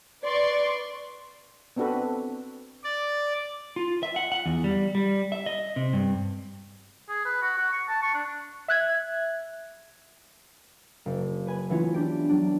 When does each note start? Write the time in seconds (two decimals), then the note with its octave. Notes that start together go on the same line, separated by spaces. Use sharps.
0.23 B4 D5 C6 C#6
1.76 B3 C4 D4 F#4 A4 B4
2.84 D5
3.76 F4
4.03 E5
4.16 F#5
4.32 F#5
4.46 E2
4.64 G3
4.95 G3
5.32 E5
5.46 D#5
5.76 C3
5.93 G2
7.09 G#4
7.25 B4
7.42 F#4
7.57 F#4
7.73 C#6
7.89 A5
8.02 C#6
8.14 D4
8.68 E5 F#6 G#6
11.06 F#1
11.47 B4 G#5 B5
11.70 E3 A3 B3 C#4 E4 F4
11.94 D4 G4 G5
12.29 F#3 D4